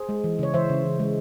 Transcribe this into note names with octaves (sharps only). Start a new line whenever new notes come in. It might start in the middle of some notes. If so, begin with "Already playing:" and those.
Already playing: G#4 C5
G#3
E3
C#3 C#5
E3 C5 E5
C#3
E3
G#3